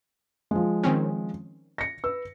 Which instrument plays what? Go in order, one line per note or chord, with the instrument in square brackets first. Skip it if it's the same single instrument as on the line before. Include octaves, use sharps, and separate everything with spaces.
[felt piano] F3 G#3
[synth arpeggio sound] D#3 C4 C#4
[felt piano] A#6 C#7
B4 E6